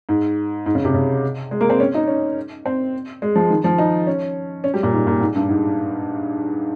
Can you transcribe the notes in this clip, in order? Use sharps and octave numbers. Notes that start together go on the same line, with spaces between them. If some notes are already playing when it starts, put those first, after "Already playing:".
G#2
G#2
C#3
C3
C#3
G#3
A#3
C4
C#4
D#4
C#4
C4
G#3
F3
D#3
F3
D#4
C#4
C#4
G3
A#2
G#2
A#2
G#2
G2
G#2